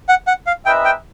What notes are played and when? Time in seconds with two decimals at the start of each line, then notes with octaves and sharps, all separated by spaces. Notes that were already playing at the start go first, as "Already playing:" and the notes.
0.09 F#5
0.27 F#5
0.47 F5
0.66 C4 D#4 G#4 B4 E5 G5
0.85 G5